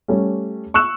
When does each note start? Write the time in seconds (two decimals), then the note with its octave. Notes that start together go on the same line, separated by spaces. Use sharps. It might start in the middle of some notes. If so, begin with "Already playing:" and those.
0.08 G3 A3 C#4
0.74 C#6 E6 F#6 E7